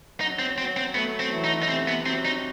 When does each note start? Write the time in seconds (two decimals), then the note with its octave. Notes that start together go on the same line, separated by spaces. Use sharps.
0.21 F#3 D#4
0.39 C4
0.57 F#3 C4
0.77 C4
0.94 A3 B3
1.20 C4
1.32 E3
1.44 D#4
1.63 D#4
1.69 C3 C4
1.88 B3
2.06 F#3 C4
2.25 D#4